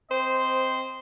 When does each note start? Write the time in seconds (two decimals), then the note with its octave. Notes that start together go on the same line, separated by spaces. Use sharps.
0.10 C4 C5 D#5 C6